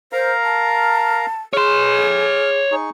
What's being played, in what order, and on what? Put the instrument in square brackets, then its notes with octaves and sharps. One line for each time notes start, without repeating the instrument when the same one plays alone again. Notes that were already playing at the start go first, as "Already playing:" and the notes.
[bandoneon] A#4 F5 A#5 [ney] C5
[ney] A5
[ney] G#4 [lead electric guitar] C#5 C6 [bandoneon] F6
[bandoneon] D#4 G#4 C#6